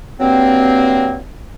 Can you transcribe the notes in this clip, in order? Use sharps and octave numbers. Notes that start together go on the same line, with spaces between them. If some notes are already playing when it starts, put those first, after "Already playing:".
G2 F#3 A#3 C4